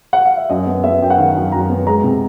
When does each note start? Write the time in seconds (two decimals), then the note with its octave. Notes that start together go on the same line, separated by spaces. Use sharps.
0.13 F#5
0.25 F5
0.37 E5
0.50 F#2 D#5
0.67 B3
0.84 B3 E5
1.02 F#2 G5
1.10 F#5
1.18 D#3 F5
1.36 F#2
1.52 F#2 A#5
1.70 B3
1.87 G#3 A#5
2.04 C3